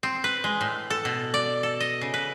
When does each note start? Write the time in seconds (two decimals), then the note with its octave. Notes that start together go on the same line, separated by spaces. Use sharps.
0.03 C4
0.24 B4
0.44 G#3
0.61 A2
0.90 A4
1.05 B2
1.34 D5
1.63 A4
1.80 D#5
2.01 C#3
2.14 B4